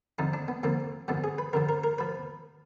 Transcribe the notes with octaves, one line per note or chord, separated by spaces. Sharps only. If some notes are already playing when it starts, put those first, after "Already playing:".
F2 D3 F3 D#4
D4
B3
F2 D3 F3 A#3
F#2 D3 F3 B3
G#4
B4
F#2 D3 F3 A#4
A#4
A#4
F3 B4